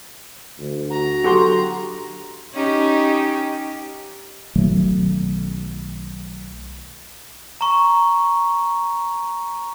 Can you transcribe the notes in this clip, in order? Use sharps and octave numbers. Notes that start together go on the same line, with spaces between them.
D2
F#4 A#5
D3 F#3 F#4 G4 C6
C#4 D#4 G4
B1 D#3 F#3 A3
A#5 C#6